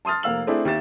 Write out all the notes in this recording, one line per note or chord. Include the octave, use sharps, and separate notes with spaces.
A5 C6 D#6 F6 A6
F1 A#3 F5 E6 F#7
A3 C4 D4 E4 G#4
D#2 G4 E5 A6 E7